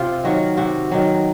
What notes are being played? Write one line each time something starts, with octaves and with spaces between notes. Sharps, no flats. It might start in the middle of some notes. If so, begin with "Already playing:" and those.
Already playing: C3 F4
D#3 F#3 F#4
C3 F#4
D#3 F#3